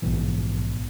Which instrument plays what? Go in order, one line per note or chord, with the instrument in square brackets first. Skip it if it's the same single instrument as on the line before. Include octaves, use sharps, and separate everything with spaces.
[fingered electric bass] A#1 G#2 B2 E3